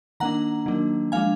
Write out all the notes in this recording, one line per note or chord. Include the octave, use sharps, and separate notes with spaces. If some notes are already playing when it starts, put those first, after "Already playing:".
D#3 A#3 D4 F#5 A#5
D#3 F#3 A#3 D4
F3 G#3 D4 F5 G#5